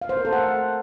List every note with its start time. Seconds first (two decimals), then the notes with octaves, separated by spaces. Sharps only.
0.02 F5
0.09 C5
0.17 A#4
0.25 A4
0.33 F#5